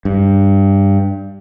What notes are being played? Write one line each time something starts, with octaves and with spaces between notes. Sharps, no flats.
G2